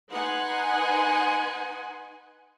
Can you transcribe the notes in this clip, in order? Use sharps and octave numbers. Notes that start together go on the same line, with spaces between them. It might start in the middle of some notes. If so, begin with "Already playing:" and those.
D#4 B4 F#5 G#5 C6